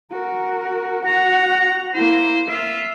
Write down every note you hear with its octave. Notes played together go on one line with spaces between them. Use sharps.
F#4 A#4
F#4 F#5 A#5
A#3 E4 C5
F4 E5